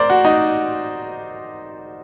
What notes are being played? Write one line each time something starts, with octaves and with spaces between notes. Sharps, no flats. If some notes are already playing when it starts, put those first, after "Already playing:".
Already playing: A#4 C5 D5
F#4
D#4